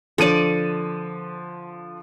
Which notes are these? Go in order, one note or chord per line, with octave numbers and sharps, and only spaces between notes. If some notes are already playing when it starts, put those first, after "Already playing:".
D3 F3 A4 D5 D#7